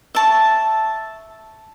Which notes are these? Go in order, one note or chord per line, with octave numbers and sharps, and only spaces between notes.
E5 A5 C#6